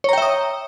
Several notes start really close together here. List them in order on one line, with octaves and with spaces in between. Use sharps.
C#5 A#5 G5 E5 D#6